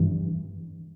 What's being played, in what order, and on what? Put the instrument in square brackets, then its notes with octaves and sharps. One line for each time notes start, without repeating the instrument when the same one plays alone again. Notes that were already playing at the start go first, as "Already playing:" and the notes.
Already playing: [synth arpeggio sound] G2 E3